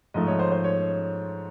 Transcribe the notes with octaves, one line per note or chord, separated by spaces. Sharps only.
G#2 F3 A3 D#5
C#5
C5
C5
C#5